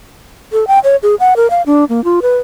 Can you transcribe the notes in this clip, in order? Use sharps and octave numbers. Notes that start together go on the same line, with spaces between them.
A4
G5
C#5
G#4
F#5
A#4
F5
D4
A#3
F4
B4